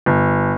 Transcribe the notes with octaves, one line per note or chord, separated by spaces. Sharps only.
G1